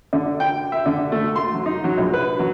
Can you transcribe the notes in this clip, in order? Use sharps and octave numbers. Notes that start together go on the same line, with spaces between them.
D3
G5
E5
D3
A3
C6
F#3
D#4
F#3
A#1
B4
F#3